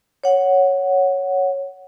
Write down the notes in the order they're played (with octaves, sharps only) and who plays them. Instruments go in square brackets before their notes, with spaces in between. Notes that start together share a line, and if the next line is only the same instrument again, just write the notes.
[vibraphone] C#5 F#5